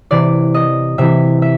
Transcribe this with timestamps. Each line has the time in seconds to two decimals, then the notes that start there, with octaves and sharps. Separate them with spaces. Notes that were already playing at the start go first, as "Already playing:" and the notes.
0.11 C3 E3 D5
0.54 D#5
0.98 C3 E3 E5
1.42 E5